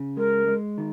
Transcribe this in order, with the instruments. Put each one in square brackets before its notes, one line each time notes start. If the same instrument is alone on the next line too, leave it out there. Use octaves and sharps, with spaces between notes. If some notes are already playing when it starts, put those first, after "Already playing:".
Already playing: [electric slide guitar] C#3
[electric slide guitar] G#3 [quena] A#4
[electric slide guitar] G#3
D#3